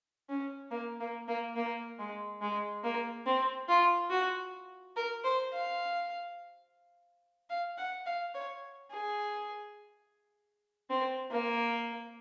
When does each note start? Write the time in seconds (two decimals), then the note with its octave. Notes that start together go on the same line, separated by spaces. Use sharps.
0.29 C#4
0.72 A#3
1.01 A#3
1.28 A#3
1.56 A#3
1.99 G#3
2.42 G#3
2.84 A#3
3.26 C4
3.68 F4
4.11 F#4
4.96 A#4
5.25 C5
5.53 F5
7.50 F5
7.78 F#5
8.07 F5
8.35 C#5
8.91 G#4
10.90 C4
11.31 A#3